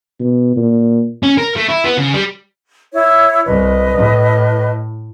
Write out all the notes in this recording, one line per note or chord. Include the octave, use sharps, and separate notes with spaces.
B2
A#2
C#4
A#4
A3
E4
B3
C#3
G3
E4 C#5 E5
C2 B4 D#5
A2